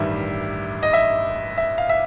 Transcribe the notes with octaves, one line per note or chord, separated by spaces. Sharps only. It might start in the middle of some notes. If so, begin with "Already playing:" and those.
Already playing: A1 G2 D#3 G3 E5
D#5
E5
E5
F5
E5